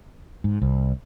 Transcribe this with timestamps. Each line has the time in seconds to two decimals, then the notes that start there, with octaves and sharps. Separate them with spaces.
0.44 G#2
0.62 C2